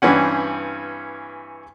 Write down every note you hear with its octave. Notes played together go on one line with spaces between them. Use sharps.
G2 E3 C4 C#4 F#5